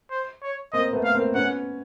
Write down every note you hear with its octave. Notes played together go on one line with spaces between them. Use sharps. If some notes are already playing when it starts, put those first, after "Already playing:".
C5
C#5
A#3 C4 D#5
A3 B3
F5
A#3 C4
B3 C#4 F#5